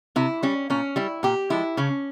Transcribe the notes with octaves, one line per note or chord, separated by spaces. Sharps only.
C3 E4
G3 C#4
A#2 C#4
G3 E4
A#2 G4
F3 G#3 E4
C#3 C#4